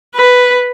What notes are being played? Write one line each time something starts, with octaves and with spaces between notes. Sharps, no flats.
B4